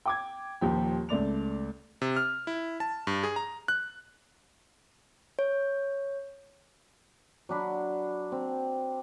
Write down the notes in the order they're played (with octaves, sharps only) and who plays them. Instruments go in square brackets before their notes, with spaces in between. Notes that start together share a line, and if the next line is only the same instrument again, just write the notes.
[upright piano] G5 D6 G#6
D#1 D#2 F3 G4
C#2 A3 D5 F7
[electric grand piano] C3
F6
E4
A5
G2
G#4
A#5
F#6
[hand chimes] C#5
[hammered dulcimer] F#3 D4 B5
C4